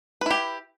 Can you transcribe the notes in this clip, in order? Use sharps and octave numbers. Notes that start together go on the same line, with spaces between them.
E4 G4 B4